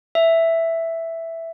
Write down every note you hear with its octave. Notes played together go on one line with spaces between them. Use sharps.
E5